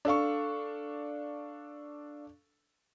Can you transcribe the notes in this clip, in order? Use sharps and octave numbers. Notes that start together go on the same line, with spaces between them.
D4 A4 F5 C#6